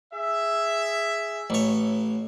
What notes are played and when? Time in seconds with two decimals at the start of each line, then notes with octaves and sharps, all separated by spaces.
0.13 G#4 E5
1.50 A1 C#5